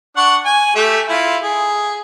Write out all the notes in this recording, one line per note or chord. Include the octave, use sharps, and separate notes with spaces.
D4 F#5 C#6
G#5
A3 G4 E5
E4 F4
G#4